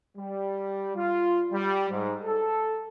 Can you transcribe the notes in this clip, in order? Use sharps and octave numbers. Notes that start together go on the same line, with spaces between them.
G3
F4
G3
G#2
A4